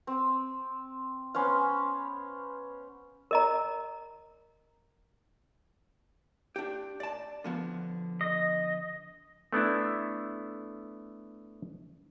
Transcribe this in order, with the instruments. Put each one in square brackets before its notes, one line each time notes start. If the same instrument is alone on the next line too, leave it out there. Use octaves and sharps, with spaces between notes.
[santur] C4
B3 C#4 C5 F5
[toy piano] A#4 D#5 A#5
[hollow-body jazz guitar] D4 G4
D5 A5
D3 F3 B3
[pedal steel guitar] D#5
[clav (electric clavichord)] A3 B3 D4 E4